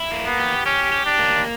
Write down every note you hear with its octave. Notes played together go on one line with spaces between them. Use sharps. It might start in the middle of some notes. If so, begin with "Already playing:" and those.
Already playing: E4
A#3
B3
G4
C#4 G4
G4
D4
A#3